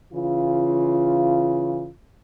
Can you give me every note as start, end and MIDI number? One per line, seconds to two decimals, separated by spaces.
0.12 1.89 49
0.12 1.89 52
0.12 1.89 65